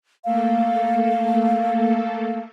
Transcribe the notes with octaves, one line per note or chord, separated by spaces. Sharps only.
A3 A#3 A4 F5